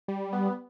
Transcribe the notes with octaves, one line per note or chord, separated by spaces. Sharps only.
G3
B3